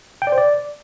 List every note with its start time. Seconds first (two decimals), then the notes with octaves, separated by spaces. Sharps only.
0.22 G5
0.27 D5
0.32 C5
0.38 D5